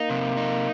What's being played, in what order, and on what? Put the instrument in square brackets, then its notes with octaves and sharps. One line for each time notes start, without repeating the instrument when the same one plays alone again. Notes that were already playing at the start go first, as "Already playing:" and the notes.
Already playing: [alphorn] A#3 [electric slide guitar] D#4
[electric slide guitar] C3
D#4